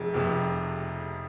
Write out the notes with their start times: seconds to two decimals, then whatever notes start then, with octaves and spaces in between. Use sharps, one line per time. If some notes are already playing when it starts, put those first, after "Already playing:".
Already playing: F1 F2 C3 G#4
0.14 F1 F2 C3